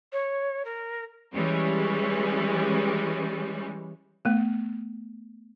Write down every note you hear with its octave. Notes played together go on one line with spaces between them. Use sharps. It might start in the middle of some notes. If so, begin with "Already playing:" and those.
C#5
A#4
E3 G3 G#3 C#4
A3 B3